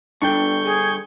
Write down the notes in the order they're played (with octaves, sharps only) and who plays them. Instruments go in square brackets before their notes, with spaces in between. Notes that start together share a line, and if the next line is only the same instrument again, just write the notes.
[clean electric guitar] G2 D3 [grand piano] D4 G5 [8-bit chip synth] C#6 G6
[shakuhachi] G#4